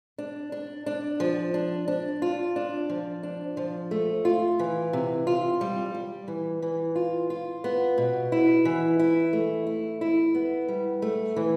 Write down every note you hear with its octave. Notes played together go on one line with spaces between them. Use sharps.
D4
D4
D4
F3
D4
D4
F4
D4
F3
D4
F3
A3
F4
E3
C3
F4
G3
G3
E3
E3
F4
F4
B3
B2
E4
E3
E4
A3
E4
E4
B3
G3
A3
E3